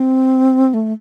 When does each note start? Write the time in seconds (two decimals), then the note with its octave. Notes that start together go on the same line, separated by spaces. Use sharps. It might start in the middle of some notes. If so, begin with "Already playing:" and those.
Already playing: C4
0.74 A3